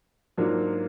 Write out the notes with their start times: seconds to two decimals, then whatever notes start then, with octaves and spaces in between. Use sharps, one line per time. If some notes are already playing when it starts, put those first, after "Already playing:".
0.38 G#2 F#3 A#3 D4 F4